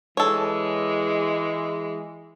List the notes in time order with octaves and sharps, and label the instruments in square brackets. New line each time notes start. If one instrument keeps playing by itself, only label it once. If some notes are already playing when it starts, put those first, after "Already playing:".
[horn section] E3 G#3 [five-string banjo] A4 C#5